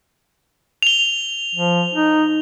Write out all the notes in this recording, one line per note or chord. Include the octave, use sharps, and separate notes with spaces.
F7 G7
F3
D#4